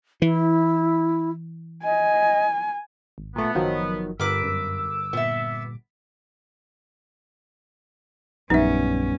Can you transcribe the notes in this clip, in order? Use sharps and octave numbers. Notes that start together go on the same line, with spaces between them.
E3 E4
D#5 G#5
G#1
A#2 A3 B3
F#1 D#3 F3 F#3
G1 G2 A#4 B4 D6 E6
F#2
A#2 B3 E5
A#1 F#2 G3 B3 C#4 D#4 E5